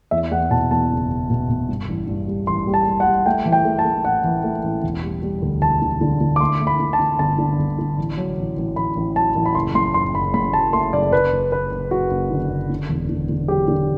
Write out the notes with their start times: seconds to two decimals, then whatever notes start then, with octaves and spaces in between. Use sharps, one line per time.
0.11 E2 E5
0.31 E2 F#5
0.50 B2 A5
0.71 E2 A5
0.90 F#1
1.10 F#1
1.30 B2
1.49 B2
1.69 G2
1.88 A1
2.08 G2
2.28 G3
2.47 A1 C6
2.67 G3
2.74 A5
2.87 G3
3.00 F#5
3.07 G3
3.26 A3 G5
3.45 E3
3.52 G5
3.65 A3
3.79 A5
3.85 A3
4.05 A1 F#5
4.24 E3
4.44 A3
4.64 A1
4.83 E1
5.03 G3
5.23 G3
5.42 D2
5.62 E1 A5
5.82 D3
6.01 D3
6.21 D3
6.36 D6
6.41 A3 C6
6.60 A3
6.67 B5
6.80 D3
6.93 A5
6.99 D3
7.19 G1 A5
7.38 D3
7.59 G1
7.79 D3
7.98 A1
8.17 F#3
8.37 A1
8.57 A1
8.76 A1 B5
8.96 A1
9.16 F#3 A5
9.35 A1
9.46 B5
9.55 F#1 C6
9.75 F#2 C6
9.94 F#1 C6
10.14 F#1 B5
10.34 F#2 B5
10.53 F#3 A5
10.73 A3 C6
10.93 F#1 D5
11.12 F#1 B4
11.32 F#1
11.52 F#1 B4
11.71 F#1
11.91 F#1 F#4
12.11 F#1
12.31 D3
12.50 F#1
12.70 D3
12.89 E1
13.09 D3
13.29 D3
13.48 F#3 G4
13.68 D3